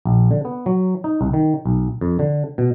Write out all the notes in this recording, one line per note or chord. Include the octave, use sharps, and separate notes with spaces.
A#1
D3
B3
F#3
D#4
C2
D#3
B1
F2
D3
B2